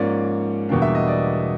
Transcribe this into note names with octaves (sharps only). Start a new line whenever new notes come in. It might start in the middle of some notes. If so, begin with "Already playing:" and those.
Already playing: G#2 F3 A#3 C#4 D5
E2 B2 G3 A#3 D4
E5
D#5
D5